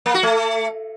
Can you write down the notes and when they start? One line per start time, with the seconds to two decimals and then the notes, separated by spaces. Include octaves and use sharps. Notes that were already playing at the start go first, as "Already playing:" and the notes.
0.06 A#3
0.14 F#4
0.23 A3